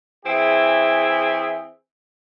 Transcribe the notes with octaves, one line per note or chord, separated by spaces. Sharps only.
E3 C4 E4 G#4 E5